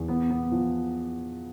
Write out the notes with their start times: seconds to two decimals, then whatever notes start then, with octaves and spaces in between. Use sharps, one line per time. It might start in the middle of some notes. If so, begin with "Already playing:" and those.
Already playing: E2
0.08 B3
0.30 B3
0.52 F3